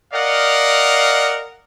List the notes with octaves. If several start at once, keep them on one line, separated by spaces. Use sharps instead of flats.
A#4 D5 D#5 F5 F#5